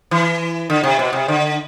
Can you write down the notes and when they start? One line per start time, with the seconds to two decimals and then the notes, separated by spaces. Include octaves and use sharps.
0.11 E3
0.70 D3
0.84 C3
0.99 B2
1.13 C3
1.28 D3